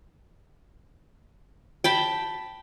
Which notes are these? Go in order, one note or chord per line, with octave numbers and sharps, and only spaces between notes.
G5 A5 B5